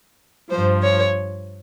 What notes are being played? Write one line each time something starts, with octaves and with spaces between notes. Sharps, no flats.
G2 F3 C5
C#5